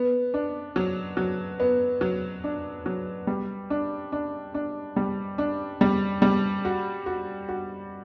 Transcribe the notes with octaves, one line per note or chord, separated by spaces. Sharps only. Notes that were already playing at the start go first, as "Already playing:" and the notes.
Already playing: B3
D4
F#3
F#3
B3
F#3
D4
F#3
G3
D4
D4
D4
G3
D4
G3
G3
F#4
F#4
F#4